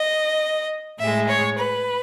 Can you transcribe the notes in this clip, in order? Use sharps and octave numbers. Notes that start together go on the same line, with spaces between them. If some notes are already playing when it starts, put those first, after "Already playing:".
Already playing: D#5
A2 G#3 E5
C#5
B4